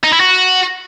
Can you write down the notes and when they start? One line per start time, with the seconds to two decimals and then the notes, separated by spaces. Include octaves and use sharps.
0.04 D#4
0.12 E4
0.20 F#4